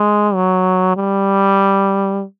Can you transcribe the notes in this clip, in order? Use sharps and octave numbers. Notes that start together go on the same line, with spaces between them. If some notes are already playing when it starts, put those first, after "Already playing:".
Already playing: G#3
F#3
G3